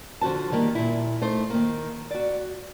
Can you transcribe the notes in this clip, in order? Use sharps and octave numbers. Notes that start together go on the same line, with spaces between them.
D3 F3 F#4 C5 A5
D#3 G3 A#3
A#2 E4
A3 D#4 C5
D#3 A#3
F#4 D5